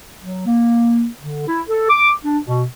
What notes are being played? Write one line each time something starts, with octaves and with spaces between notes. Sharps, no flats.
F#3
A#3
D3
E4
A4
D6
D4
B2